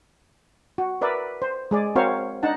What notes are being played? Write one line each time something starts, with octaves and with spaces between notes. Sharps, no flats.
F#4
A#4 B4 D5 E5
C5
G#3 G#4 D5
C4 F#4 A#4 C5 C#5 F5
D4 D#4 F#5 A5